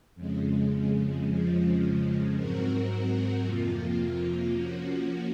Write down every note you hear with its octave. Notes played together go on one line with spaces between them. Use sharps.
F2 C#3 G#3
F2 C#3 F3 G#3
G#2 F#3 C4 F#4 A#4
F2 C3 F3 A#3 F4
F3 A#3 C#4 F#4